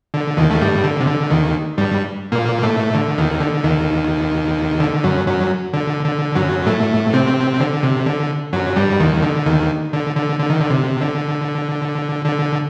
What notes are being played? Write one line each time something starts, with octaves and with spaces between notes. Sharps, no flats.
D3
D#2 D#3
A3
G2 G3
D3
C3
D3
D#2 D#3
G2 G3
A#2 A#3
A2 A3
D3
D#2 D#3
D3
D#2 D#3
D3
F#2 F#3
F#2 F#3
D3
D3
F#2 F#3
A2 A3
C3 C4
D3
C3
D3
F#2 F#3
G2 G3
D#2 D#3
D3
D#2 D#3
D3
D3
D3
D#3
D3
C3
D3
D3